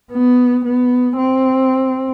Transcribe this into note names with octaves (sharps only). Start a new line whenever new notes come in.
B3
B3
C4